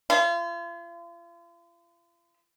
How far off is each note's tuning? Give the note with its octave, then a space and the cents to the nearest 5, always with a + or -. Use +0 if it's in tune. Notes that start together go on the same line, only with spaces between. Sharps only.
F4 -40